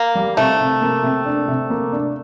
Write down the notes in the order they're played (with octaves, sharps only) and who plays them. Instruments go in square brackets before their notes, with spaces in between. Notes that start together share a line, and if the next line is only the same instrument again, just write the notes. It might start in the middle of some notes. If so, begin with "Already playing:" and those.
Already playing: [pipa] A#3
[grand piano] G3
[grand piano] C3 [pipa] A3
[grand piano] C3
A#3
C3
D4
C3
A#3
D4